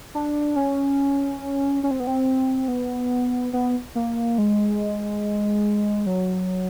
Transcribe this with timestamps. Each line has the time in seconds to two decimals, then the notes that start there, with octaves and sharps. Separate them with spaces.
0.15 D4
0.56 C#4
1.83 C#4
1.91 C4
2.00 B3
2.07 C4
2.68 B3
3.53 B3
3.95 A#3
4.38 G#3
6.06 F#3